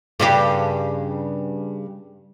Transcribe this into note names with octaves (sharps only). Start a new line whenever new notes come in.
G2 C#3 G4